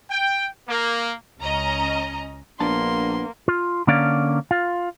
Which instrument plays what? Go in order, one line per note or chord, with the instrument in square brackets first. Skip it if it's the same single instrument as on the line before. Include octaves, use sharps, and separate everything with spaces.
[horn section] G5
A#3
[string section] C#2 C#4 D#5 A#5
[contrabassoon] A#1 [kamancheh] A#3 [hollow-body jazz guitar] B3 D4 A5 [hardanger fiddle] C6
[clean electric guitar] F4
D3 A#3 C#4 D5 F5
F4